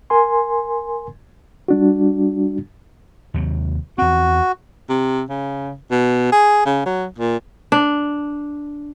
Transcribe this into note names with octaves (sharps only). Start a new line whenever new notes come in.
A#4 G#5 C6
G3 D4 F#4
D#2 C3 F#3
E2 C4 F#4
C3
C#3
B2
G#4
C#3
F#3
A#2
D4